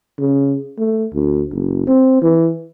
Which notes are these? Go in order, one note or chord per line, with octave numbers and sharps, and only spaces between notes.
C#3
A3
D2
F#1
C4
E3